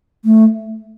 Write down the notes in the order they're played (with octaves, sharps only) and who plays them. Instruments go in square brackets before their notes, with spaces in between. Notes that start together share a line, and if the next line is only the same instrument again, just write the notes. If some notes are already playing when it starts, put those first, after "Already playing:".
[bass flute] A3